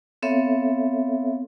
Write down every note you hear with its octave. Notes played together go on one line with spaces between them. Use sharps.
B3 C4 A4 C#5 E5 F5